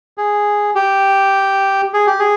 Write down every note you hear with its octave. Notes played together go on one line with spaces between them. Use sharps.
G#4
G4
G#4
G4
G#4